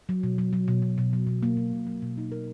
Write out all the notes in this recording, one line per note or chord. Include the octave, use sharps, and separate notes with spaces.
F#3
B2
F#3
F#3
B2
B2
B2
F#3
B2
A#3
B2
B2
F#3
B2
D#4
A#4